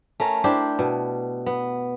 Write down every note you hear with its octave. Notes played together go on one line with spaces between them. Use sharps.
A3 C#4 A#4
D4 E4 G4 C5
B2
B3